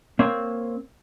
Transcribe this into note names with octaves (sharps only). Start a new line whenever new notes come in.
A#3 C4 C#5